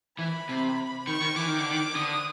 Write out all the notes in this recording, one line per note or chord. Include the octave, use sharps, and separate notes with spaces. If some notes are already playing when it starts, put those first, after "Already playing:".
E3 B5
C3
D#3 C#6
D#3
E3 D6
D#3
D3
D#3
D3 D#6